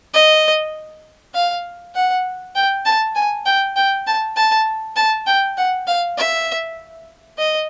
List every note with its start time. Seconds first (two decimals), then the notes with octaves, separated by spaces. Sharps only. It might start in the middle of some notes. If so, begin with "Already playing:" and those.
0.14 D#5
1.34 F5
1.95 F#5
2.55 G5
2.86 A5
3.15 G#5
3.46 G5
3.76 G5
4.07 A5
4.36 A5
4.96 A5
5.27 G5
5.57 F#5
5.87 F5
6.17 E5
7.38 D#5